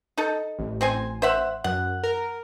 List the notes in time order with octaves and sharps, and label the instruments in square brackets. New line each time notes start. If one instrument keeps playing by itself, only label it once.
[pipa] D#4 A4
[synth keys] A1
[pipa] C4 C5 G#5
C5 E5 F#5
[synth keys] F#2 [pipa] F#5
[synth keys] A#4